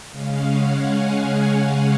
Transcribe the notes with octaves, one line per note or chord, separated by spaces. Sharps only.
C#3 G#3 C#4 F5
F#5
G#5
F5